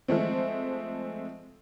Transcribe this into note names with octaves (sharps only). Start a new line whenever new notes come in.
F3 G#3 A3 C4